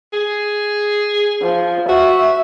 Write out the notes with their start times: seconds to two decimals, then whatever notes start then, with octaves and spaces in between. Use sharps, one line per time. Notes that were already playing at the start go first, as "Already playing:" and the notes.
0.13 G#4
1.42 F3
1.89 F#4 E5